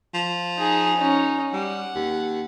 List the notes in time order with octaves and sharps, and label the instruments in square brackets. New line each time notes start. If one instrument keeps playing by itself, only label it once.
[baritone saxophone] F3
[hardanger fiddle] D#4 G#4
C#4 D#4
[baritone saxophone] G3 [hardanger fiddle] F#5
[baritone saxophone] D#2